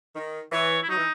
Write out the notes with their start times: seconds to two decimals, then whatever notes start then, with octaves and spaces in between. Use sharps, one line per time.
0.16 D#3
0.52 E3 C#5
0.83 E4
0.89 F#3 D#4
0.97 E3